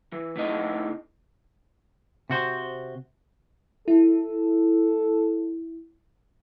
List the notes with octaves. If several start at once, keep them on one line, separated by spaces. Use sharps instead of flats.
E3
A2 C3 D#4 D#5
C3 F#4 C5
E4 A4